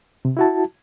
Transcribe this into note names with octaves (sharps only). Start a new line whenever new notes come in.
C3
E4 F#4 A5